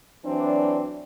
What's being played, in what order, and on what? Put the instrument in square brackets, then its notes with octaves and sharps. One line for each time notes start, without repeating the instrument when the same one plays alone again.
[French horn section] E3 F#3 C4 D4